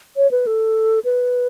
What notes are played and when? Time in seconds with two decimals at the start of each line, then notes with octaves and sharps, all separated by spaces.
0.17 C#5
0.31 B4
0.47 A4
1.05 B4